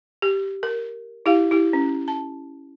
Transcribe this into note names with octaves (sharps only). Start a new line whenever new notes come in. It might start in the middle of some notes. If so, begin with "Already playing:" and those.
G4
A#4
E4 G4 F5
E4 G4
C#4
A5